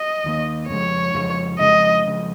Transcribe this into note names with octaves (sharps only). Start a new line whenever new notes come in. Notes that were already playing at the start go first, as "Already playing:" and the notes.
Already playing: D#5
D#2 D#3 A#3
F2 C#3 G#3 C#5
F2 C#3 G#3
F2 C#3 G#3 D#5
F2 C#3 G#3